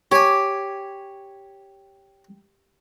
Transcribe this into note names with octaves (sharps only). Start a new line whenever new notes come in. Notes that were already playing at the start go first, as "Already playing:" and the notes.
G4 C#5 G#5